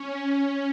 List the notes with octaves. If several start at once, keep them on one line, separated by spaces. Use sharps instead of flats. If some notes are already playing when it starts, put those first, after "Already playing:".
Already playing: C#4